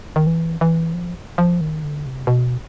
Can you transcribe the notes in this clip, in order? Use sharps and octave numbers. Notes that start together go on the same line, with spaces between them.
D#3
E3
E3
F3
F3
D#3
D3
C3
B2